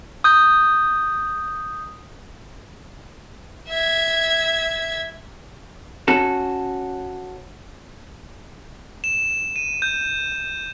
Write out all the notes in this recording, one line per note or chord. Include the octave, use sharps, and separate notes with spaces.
D#6 G6
E5 G#6
C#4 F#4 A4
E7
D#7
G6